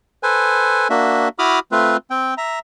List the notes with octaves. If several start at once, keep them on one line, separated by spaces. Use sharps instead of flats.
A4 B4 C5 G#5
A#3 D4 F#4 E5
E4 F#4 B5 D6 D#6 F6
A3 C4 F4 B4
C4 G5
E5 A#5